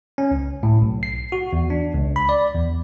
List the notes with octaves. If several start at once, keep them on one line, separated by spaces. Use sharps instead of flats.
C#4
C#2
A2
B1
C7
F#4
E2
D4
C#2
B5
D5
E2